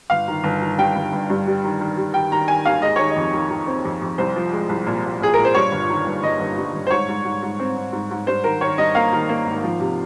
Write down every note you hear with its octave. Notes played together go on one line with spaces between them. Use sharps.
G1 F5
D#3
G1
D#3
G2 G5
G1
G1
G2
G3
D#3
D#3
G3
D#3 G5
D#3 A#5
D#3 G#5
D#2 F5
G#3 D#5
D#3 C#5
D#5
F2
D#3
D#3
C4
F2
F2
C2 C5
F3
G#3
C2
A#2
A#2
A#2 G#4
A#2 A#4
C5
G2 C#5
G1
D#3
G1
G1 D#5
G1
G2
G1
C5
G#2 C#5
G#2
G#2
G#2
C4
C4
G#2
G#2
G2 C5
D#3 A#4
D#3 C#5
G2 D#5
A#3 F5
D#3
A#3
G#1
F3
C3